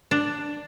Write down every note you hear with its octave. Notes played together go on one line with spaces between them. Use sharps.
D4